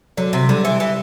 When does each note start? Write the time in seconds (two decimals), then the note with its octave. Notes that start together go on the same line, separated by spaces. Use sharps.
0.17 D3 F#3
0.33 C3
0.49 D3 G3
0.65 E3
0.80 E3